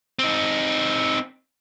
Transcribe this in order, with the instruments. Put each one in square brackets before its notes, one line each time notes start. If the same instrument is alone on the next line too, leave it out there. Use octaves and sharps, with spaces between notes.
[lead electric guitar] C4 D#4